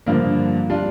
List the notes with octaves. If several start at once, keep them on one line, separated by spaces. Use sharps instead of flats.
G2 D3 F3 A#3
G3 D4 F4